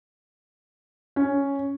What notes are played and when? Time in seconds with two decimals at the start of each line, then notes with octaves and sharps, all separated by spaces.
1.16 C#4